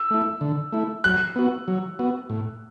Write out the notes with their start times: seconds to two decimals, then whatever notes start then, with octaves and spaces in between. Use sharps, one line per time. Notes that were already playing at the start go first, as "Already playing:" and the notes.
Already playing: E6
0.11 A3 E4
0.41 D3
0.72 A3 E4
1.04 F#3 F#6
1.36 B3 F#4
1.68 F#3
1.99 B3 F#4
2.30 A2